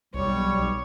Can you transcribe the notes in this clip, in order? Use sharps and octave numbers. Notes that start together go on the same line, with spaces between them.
B1 G3 C#5